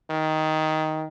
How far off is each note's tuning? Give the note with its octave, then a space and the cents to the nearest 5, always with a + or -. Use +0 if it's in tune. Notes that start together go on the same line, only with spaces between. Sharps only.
D#3 +10